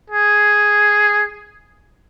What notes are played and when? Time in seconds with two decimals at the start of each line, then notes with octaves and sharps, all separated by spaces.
0.10 G#4